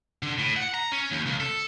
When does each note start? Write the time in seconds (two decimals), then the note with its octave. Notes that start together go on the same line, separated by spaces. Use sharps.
0.23 D3
0.39 A2
0.56 F#5
0.74 A#5
0.92 C#4
1.11 D#2
1.26 C#2
1.40 A4